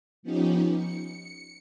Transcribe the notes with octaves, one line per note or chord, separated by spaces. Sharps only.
F3 B3 C#4 D#4 G4
C#7